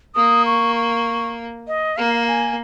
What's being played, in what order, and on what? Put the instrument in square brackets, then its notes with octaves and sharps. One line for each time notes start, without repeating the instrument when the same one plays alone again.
[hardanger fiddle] A#3 [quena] D#6
[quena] C#6
C#6
D#5
[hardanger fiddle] A#3 [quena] F5
[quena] G#5